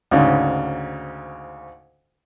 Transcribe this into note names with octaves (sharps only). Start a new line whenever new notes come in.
D2 G#2 C#3